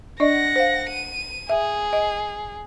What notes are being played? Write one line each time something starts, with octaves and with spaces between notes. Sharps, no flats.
D4 D5 D#5 F#5 A#6
C5 F5
D#7
G#4 E5
D#5